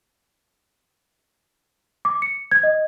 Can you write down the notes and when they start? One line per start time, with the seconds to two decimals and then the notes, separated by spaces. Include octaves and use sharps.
2.05 D6
2.22 C#7
2.51 G#6
2.63 D#5